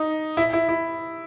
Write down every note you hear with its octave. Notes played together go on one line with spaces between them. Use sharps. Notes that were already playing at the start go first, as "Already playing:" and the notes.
Already playing: D#4
E4
E4
E4